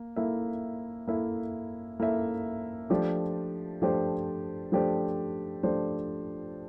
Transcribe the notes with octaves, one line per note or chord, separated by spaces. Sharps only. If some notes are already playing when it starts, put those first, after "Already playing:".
Already playing: A#3
A#3 E4 A4 E5
A#3 E4 A4 E5
A#3 E4 A4 E5
F3 A3 D4 G4 C5
F3 A3 D4 G4 C5
F3 A3 D4 G4 C5
F3 A3 D4 G4 C5